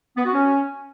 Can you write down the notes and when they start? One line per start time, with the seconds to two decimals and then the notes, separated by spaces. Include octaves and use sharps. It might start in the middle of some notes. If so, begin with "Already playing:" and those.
0.17 B3
0.25 F#4
0.33 C#4